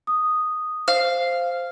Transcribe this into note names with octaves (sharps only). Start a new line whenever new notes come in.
D#6
C5 F5